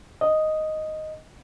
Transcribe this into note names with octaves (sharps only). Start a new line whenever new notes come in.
D#5